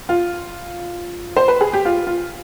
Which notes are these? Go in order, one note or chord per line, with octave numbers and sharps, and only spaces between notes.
F4
C5
B4
G#4
G4
F4
F4